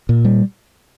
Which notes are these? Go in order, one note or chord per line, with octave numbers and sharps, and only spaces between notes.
A#2
G3